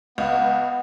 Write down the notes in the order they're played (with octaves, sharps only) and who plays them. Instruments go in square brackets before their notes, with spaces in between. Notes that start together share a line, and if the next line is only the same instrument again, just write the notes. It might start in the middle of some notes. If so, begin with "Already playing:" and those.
[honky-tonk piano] C#2 [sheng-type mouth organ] B3